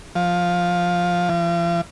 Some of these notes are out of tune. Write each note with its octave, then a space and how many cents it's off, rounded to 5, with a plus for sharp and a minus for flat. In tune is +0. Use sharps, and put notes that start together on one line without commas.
F3 +10
F3 -40